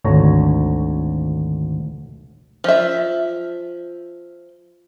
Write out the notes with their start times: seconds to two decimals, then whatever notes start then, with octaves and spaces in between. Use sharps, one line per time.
0.04 G#1 D2 D3 C#5 A#5
2.64 F3 E5